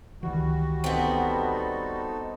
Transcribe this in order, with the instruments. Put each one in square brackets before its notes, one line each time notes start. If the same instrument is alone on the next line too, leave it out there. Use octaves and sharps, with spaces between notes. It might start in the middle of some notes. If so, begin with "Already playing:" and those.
[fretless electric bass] C#2 D#3 E3 [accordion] G3 F#4
[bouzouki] B3 C4 [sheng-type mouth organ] D#4 A4